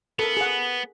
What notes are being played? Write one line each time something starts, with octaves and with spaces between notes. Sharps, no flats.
B3 A4 A#4
G#4 F#5